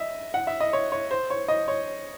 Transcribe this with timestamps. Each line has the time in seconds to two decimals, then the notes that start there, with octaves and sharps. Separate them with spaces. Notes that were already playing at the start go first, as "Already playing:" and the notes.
Already playing: D#5 E5
0.34 F#5
0.47 E5
0.60 D#5
0.73 C#5
0.92 C#5
1.11 C5
1.30 C#5
1.48 D#5
1.68 C#5